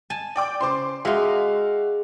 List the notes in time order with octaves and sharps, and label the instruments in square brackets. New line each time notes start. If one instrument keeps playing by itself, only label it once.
[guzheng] G#5 A5
[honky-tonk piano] D5 G5 D6
[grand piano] C#3 C5 D6 [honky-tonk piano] C6
[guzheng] G#3 D#4 [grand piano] F#4 E5 F5